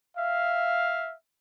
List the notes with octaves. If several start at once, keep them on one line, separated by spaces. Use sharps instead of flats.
E5 F5